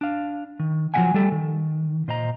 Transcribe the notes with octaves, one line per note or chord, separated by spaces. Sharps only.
D4 F5
D#3
F3 F#3 A3 E5 F#5 G#5
G3 A3 A4
D#3
A#2 C5 D#5 A#5